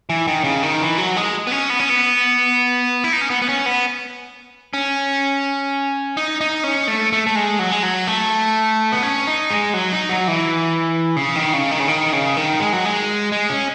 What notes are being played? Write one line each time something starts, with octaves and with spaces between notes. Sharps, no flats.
E3
D#3
C#3
D#3
E3
F#3
G#3
B3
C#4
B3
C#4
B3
E4
D#4
C#4
B3
B3
C#4
B3
C#4
D#4
D#4
C#4
A3
A3
A3
G#3
F#3
G#3
F#3
A3
B3
C#4
D#4
G#3
F#3
D#4
F#3
E3
C#3
D#3
C#3
D#3
C#3
D#3
C#3
D#3
G#3
F#3
G#3
G#3
C#4